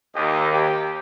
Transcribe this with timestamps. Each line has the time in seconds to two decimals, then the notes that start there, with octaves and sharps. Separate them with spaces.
0.15 D#2 G4 D#5
0.53 G4